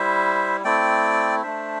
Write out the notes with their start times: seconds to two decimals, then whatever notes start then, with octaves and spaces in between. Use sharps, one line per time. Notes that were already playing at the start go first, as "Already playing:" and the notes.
Already playing: G3 E4 C5 E5
0.64 A3 C4 E4 D5 G5
1.43 A3 D4 C5 E5